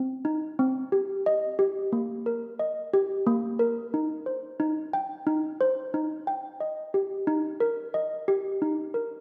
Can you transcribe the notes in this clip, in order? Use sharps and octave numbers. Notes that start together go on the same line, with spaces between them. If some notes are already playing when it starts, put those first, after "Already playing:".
Already playing: C4
D#4
C4
G4
D#5
G4
A#3
A#4
D#5
G4
A#3
A#4
D#4
C5
D#4
G5
D#4
C5
D#4
G5
D#5
G4
D#4
A#4
D#5
G4
D#4
A#4